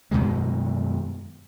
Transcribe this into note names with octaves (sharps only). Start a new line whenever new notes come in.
F#2 B2 D#3 G#3